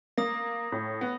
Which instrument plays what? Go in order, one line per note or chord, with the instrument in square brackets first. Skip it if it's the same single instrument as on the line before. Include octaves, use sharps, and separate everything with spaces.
[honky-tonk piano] A#3 [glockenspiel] D#6 A#6
[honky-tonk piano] A2
B3